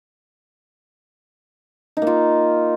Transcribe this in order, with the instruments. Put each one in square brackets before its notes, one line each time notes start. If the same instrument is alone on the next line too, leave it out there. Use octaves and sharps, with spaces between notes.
[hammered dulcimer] D#4
A#3
F4